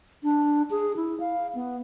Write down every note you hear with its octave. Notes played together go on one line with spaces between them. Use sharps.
D4
G#4
E4
F5
B3